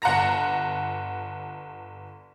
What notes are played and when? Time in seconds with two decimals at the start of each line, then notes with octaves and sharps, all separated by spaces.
0.02 G1 F#5 A5 A#5 A#6